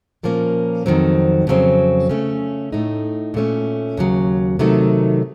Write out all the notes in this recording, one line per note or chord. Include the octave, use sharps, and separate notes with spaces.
A#2 F3 A#3 C#4
F2 D#3 F#3 C4
F2 C#3 F#3 C4
C#3 A3 C#4
A2 A3 D#4
A#2 A3 C#4
D#2 C#3 F#3
C3 D#3 F#3 A3 D#4